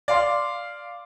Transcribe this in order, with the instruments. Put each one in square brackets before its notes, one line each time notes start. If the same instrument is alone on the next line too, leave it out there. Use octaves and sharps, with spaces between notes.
[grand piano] D5 F5 C6